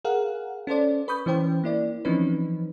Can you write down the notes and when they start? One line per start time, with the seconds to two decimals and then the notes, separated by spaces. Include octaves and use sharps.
0.05 G#4 A#4 F5 F#5
0.67 C#4 A4 C5 D5
1.08 B4 B5 C#6 D#6 G6
1.26 E3 C#4 C5 G5
1.64 A#3 E4 D5
2.05 E3 F3 C4 C#4 D#4 B4